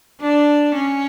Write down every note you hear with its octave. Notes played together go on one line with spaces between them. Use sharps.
D4
C#4